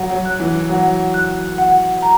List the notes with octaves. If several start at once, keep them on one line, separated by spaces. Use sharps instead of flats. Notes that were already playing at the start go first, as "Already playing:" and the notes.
Already playing: F#3 F#5
F#3
F#6
E3
F#3 F#5
F#6
F#5
A#5